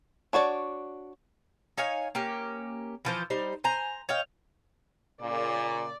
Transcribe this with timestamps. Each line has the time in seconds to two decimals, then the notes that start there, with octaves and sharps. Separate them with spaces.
0.33 D4 F#4 C#5 D5
1.78 D#4 C#5 F5 G#5
2.15 A#3 C#4 G4
3.05 E3 F3 C5
3.30 G3 D#4 C5
3.64 C5 G#5 A#5
4.09 C#5 D#5 F5 G5
5.22 A#2 C#3 D5